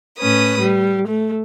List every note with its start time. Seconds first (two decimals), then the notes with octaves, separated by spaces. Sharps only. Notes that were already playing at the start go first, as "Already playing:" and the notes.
0.19 A2 C#4 B4 D#6
0.60 G3
1.08 A3